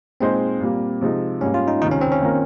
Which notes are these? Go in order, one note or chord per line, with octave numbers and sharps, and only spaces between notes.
A#2 G#3 C4 D#4 G#4 C5
A#2 G3 A#3
C3 F3 G#3 D#4
G#2 G3 A#3 C#4
F4
D#4
C#2 C3 D#3 D#4
C#4
C4
C#4
D#3 A#3 F4 A#4